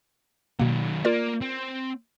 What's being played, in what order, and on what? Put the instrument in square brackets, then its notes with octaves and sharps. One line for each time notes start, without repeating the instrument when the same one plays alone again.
[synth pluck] B2 A#3 [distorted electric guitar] D#3 F#3
[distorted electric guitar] A#3 [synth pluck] F4 A#4 D5
[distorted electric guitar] C4